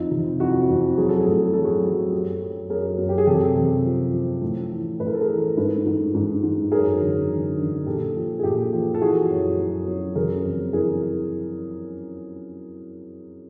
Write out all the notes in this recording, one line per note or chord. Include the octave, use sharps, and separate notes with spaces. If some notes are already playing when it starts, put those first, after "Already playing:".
Already playing: F2 D#4 F4
C3
F2 E4 F#4
F2
F#3 G#4
A4
G#4
A2 A4
G#4
F#3 A4
F#4 G#4
F#3
F#2 G4 A4
F#2
F#2 G#4 A#4
F#2
G4
G#4
C3 G4 A4
C3
F3
F3
A2
E3
A2 B4
A#4
A4
G#4 A#4
E3
G#2 A4 B4
G#2
G#2
G#2
F#2 G#4 A#4
D3
D3
D3
A#2 G4 A4
F3
G#4
A#2 G4 A4
F3
A4
E3 F#4 G#4
F#2
F#2
F#2
C#3 G#4 A#4
F2
E3 G#4 A#4